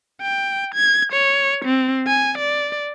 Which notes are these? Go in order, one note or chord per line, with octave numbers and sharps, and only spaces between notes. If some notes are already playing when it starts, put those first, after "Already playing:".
G5
G#6
C#5
C4
G#5
D5